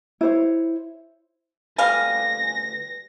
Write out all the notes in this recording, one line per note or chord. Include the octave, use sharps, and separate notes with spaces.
E4 C5 C#5
D2 G3 B4 F5 G#5 A#6